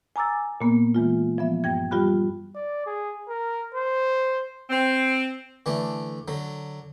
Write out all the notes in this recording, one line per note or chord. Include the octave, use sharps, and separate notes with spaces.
G#5 A#5 D6 E6 A6
A#2 A#3 B3
E3 G#3 F4
F3 B3 E5
G2 G5 G#6
G3 F4 G4 B5 F#6
D5
G#4
A#4
C5
C4
D3 E3 A3 D4
D3 F#3